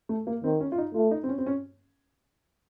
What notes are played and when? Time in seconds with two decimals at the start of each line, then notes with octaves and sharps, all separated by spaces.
0.09 A3
0.27 A#3
0.44 D#3 C4
0.61 C#4
0.72 F4
0.78 D#4
0.94 A3 F4
1.11 D#4
1.23 C4
1.29 C#4
1.38 C4
1.46 C#4